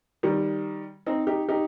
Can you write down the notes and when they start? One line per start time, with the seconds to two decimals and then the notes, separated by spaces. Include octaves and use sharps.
0.23 D#3 G3
1.06 C4 D#4
1.27 D#4 G4
1.49 D#4 G4